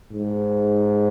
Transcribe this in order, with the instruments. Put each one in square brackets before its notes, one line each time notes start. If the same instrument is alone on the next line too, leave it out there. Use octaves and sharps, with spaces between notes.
[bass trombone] G#2